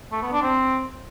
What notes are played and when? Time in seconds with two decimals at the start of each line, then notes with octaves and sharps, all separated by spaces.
0.12 A3
0.22 B3
0.32 D4
0.43 C4